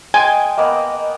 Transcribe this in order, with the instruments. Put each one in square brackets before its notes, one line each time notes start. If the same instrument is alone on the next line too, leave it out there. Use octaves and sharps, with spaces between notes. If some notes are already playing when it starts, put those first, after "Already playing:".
[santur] G#3 G5 C6 [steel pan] G#5
[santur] A#3 B3 [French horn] D#5